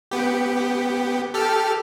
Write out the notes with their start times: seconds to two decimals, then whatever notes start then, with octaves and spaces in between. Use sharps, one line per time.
0.11 B3 G4
1.34 G4 A4 F6